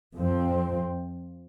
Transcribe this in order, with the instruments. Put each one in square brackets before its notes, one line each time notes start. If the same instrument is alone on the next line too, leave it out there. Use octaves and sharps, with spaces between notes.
[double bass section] F2 F3 C4